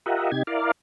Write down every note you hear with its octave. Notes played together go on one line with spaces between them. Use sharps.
F4 G4 A#4 D#5 E5 F#5
C3 D#4 G4 G#6
E4 A#4 D5 F5